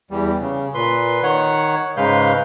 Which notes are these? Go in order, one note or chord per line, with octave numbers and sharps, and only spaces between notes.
E2 G3
C#3
A#2 B4 C6
D#3 C#5 F#5
G#2 C#3 G#3 B4 F5 G6